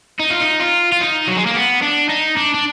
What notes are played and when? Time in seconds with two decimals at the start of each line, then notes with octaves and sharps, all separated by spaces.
0.19 D#4
0.30 F4
0.41 D#4
0.60 F4
0.92 F4
1.01 D#4
1.27 F#3
1.36 G#3
1.46 A#3
1.55 B3
1.83 D4
2.09 D#4
2.37 D4
2.54 D4